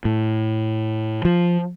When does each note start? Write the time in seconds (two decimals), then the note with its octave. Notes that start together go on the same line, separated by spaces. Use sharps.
0.05 A2
1.25 F3